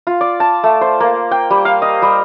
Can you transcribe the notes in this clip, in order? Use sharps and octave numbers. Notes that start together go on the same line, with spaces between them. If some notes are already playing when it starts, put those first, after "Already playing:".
F4
D5
A5
A3
C5
A#3
G5
G3
F5
D#5
G3